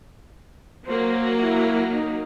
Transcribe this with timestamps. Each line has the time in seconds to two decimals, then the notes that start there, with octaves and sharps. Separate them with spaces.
0.86 F#3 A#3 C5
1.36 E4 F#4
1.94 D#4